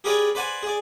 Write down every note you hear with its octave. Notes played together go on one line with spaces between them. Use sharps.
G4 G#4 A#4 B4 C#5 D5
B4 C5 D5 F#5 G#5
G#4 D5